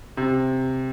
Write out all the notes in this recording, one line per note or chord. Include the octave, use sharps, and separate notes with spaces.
C3